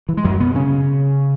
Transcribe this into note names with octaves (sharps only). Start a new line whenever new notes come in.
E3
G#3
F#2 F#3
B2 B3
C#3 C#4